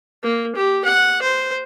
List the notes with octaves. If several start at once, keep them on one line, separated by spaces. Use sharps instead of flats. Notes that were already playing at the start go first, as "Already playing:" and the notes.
A#3
G4
F#5
C5